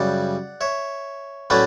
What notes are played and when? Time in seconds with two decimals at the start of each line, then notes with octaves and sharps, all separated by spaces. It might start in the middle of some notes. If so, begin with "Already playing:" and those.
Already playing: F#2 C#3 G3 D5 F#5
0.61 C#5 E5
1.50 A2 F#3 A3 C#4 E4 B4 D5